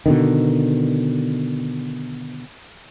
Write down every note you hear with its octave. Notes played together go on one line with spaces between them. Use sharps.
B2 D3 D#3